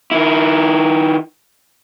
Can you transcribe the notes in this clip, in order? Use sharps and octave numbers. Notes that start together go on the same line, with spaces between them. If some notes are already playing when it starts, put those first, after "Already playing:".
D#3 E4